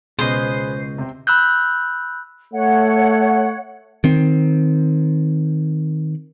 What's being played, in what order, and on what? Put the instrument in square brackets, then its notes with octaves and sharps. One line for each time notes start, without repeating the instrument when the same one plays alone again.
[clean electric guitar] C#2 C#4 D#5 [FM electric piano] B2 C7 [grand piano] G#4 B4 [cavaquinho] C5
[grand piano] C3 C4
[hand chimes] B5 E6 F#6 G6
[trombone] A3 [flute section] C#5 F#5
[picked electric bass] D#3 C4